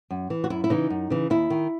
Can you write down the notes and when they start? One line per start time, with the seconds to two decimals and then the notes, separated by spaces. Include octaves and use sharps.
0.11 F#2
0.30 E3
0.44 F#4
0.50 F#2 E4
0.64 E4
0.70 C#3 E3 D#4
0.90 F#2
1.10 C#3 E3
1.30 D#2 E4
1.50 D#3